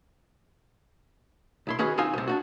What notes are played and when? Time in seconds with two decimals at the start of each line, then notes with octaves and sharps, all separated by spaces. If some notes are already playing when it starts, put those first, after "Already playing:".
1.67 B1 E4 C6
1.79 D#3 C#4 F#4 G#4 B4
1.97 C4 D#4 F4 F5 G#5 C6
2.14 C2 C3
2.28 D4 D#4 F#4